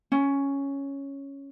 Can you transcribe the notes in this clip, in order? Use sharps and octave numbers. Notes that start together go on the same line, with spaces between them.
C#4